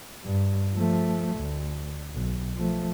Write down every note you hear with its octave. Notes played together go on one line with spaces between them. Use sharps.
G2
F3 A3
D2
B1
F3 A3